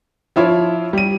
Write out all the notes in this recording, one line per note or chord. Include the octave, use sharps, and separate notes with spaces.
F3 E4 F4 C#5
G3 D#7